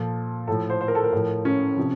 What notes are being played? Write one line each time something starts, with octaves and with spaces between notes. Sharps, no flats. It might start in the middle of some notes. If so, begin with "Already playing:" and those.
Already playing: A#2 F3 A4
A2 F3 A4
C5
C5
A#4
A4
A#4
A2 F3
C#4
C3 F3